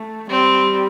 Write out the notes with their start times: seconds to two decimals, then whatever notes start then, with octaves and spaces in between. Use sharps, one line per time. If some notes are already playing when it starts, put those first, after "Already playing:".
Already playing: A3
0.30 G3 C4